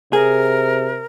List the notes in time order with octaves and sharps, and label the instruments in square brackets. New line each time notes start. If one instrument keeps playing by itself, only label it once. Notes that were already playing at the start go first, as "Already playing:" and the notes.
[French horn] C3 [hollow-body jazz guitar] G#4 [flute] A#4